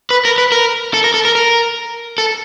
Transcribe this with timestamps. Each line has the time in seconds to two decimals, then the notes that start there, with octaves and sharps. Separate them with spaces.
0.10 B4
0.25 A#4
0.38 B4
0.52 A#4
0.94 A4
1.04 A#4
1.14 A4
1.25 A#4
1.35 A#4
2.18 A4